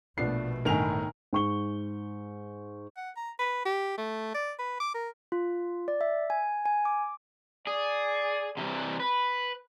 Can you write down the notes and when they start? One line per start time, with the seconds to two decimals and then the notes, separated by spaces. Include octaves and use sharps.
0.18 A#1 B2 A3 B3 D4 F4 C7
0.65 G1 A2 D#3 A#4 G#5 F7
1.33 G#2 C#6 G7
2.96 F#5
3.16 A#5
3.39 B4
3.65 G4
3.98 A3
4.34 D5
4.59 B4
4.80 D6
4.94 A#4
5.32 F4
5.88 D5
6.01 E5
6.30 G#5
6.66 G#5
6.85 D6
7.67 G#4 D5
8.57 C3 E3 G3
9.00 B4 B5